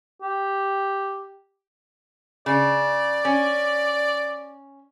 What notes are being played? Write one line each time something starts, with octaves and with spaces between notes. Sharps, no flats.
G4
C#3 D5
C#4